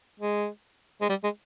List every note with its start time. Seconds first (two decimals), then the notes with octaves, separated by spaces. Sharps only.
0.20 G#3
1.01 G#3
1.09 G3
1.24 G#3